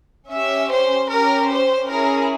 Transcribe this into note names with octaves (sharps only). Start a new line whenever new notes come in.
C#4 G4 E5
C5
C#4 G4 A#4
C5
C#4 E4 G#4 A#4